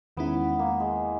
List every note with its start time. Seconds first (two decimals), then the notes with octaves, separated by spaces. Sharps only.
0.17 E2 D#3 G#3 B3 C#4 E4
0.59 A#3
0.80 G#3